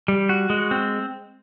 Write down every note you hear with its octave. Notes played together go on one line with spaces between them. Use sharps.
G3
F#4
G#3
C4